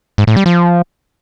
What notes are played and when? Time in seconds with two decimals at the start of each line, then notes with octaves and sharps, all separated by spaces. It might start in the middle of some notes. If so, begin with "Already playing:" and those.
0.18 G#2
0.27 A2
0.37 G3
0.46 F3